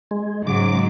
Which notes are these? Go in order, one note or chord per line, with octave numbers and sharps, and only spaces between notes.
G#3
G#2 C#3 F#3 D6